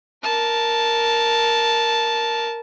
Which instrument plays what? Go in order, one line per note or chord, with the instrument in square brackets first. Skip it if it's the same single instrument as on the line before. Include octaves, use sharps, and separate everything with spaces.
[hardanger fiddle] A#4 A5